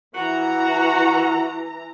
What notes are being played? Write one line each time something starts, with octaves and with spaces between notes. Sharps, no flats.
E3 F#4 A#5